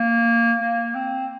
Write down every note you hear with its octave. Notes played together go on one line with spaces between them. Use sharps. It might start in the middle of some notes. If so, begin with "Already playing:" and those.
Already playing: A#3
A#3
C4